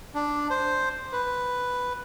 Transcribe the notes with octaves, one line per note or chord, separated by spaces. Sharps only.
D4
C5
B4